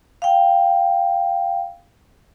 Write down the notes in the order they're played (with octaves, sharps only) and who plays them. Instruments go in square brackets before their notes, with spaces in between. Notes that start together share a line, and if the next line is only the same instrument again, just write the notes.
[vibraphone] F5 G5